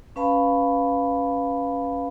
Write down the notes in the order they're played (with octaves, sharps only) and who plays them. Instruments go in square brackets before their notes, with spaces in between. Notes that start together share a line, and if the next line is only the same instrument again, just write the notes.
[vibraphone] C#4 B4 F5 A5 B5